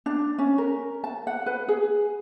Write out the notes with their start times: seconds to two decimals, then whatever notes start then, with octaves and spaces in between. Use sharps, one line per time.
0.06 D4
0.38 C#4
0.58 A#4
1.04 A5
1.27 F#5
1.46 B4
1.68 G#4